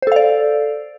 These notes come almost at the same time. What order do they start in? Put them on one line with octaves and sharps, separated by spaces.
C5 A4 F5 D5